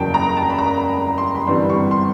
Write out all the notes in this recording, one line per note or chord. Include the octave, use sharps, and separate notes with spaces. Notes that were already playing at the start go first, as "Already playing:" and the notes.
Already playing: F#1 E2 C#3 F#3 A#3 G5 A5
A#5
A5
B5
A#5
C6
B5
G1 G2 E3 G3 C4 C6
C#6
C6